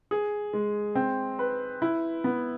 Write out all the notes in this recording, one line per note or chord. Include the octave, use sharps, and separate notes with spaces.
G#4
G#3
C4
B4
E4
B3